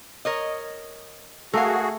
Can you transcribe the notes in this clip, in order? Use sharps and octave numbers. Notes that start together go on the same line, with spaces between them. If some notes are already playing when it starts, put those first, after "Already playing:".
A#4 C#5 D#5
A3 F#4 G#4 A#4 F5